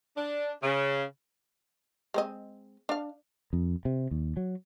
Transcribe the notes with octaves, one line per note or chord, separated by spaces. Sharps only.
D4
C#3
G#3 C4 D#5
D4 F5
F2
C3
D#2
F#3